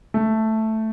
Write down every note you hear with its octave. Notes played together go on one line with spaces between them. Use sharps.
A3